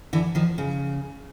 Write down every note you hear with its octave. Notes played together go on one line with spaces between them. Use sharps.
D3 E3
D#3 F3
C#3